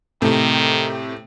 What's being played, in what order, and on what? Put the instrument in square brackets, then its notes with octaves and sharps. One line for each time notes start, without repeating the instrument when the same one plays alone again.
[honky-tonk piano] A2 C3 A3 [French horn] D#3